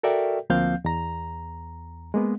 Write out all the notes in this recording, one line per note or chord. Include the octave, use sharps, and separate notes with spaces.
F#4 A4 A#4 D5 E5 G5
D2 F3 A#3 C4 F5 G6
E2 A#5
G#3 A#3 B3